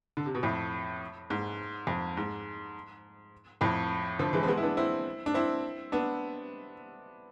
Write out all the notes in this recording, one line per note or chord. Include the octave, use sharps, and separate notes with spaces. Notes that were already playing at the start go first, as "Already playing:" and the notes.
D3
C3
B2
F2 A2
G#2
F2
G#2
F2 A2
D3 F3
E3 G#3
C4
G#3 B3
E4
B3 D4
C4 E4
D4
C4 E4
B3 D4